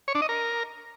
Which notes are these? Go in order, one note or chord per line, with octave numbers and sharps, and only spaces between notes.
C#5
D4
D#5
A#4